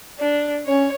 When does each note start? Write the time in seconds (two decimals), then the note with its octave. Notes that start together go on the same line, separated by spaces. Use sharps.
0.19 D4
0.66 C#4 C#5